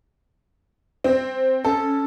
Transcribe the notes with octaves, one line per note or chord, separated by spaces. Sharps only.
C4
C#4 A4